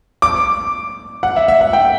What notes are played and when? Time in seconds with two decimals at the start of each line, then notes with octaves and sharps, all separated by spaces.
0.22 D6
1.23 F#5
1.36 E5
1.48 E5
1.61 F#5
1.73 G5